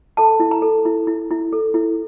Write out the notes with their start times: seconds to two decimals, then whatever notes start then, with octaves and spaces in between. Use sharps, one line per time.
0.17 A4 A5
0.40 E4
0.51 A#5
0.62 A4
0.85 E4
1.07 E4
1.30 E4
1.53 A4
1.74 E4